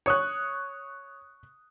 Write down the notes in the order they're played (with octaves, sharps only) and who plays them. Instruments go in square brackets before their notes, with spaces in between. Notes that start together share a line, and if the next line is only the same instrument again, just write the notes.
[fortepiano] C#5 [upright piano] C#6 D#6 F#6